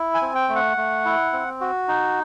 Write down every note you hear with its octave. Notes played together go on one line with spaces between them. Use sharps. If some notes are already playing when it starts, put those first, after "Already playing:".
Already playing: E4
G#5
C4
G5
A3
F#5
A3
E4
C4
F#4
D#4